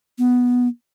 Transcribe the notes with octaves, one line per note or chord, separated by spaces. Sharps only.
B3